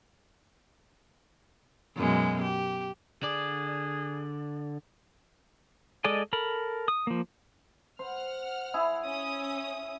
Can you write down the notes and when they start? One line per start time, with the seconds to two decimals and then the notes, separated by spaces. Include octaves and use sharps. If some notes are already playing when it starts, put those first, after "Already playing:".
1.96 F#2 B2 G#3
2.42 G4
3.23 D3 G#4 D5
6.04 G#3 A4 D5 D#5 G#5
6.33 A4 A#4 B5
6.88 D#6
7.07 F3 A#3
7.99 C5 F#5 F6
8.74 E4 G#4
9.04 C#4 D#6